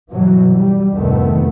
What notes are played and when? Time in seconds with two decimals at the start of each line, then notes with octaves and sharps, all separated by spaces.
0.11 G2 B2 E3 F#3
0.56 G3
0.94 F1 D2 G#2 D#3 A3 B3